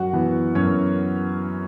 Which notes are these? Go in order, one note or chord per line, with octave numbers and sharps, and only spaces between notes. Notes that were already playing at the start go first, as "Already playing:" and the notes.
Already playing: F#2 F#4 F#5
E3 B3
F#2 C#4 C#5